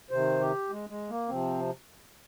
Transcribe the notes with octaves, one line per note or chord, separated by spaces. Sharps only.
C3 D#3 C5
G4
G#3
G#3
A#3
C3 F3 C4